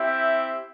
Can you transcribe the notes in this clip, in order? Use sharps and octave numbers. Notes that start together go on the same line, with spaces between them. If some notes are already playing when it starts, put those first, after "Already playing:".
Already playing: C4 E4 G4 E5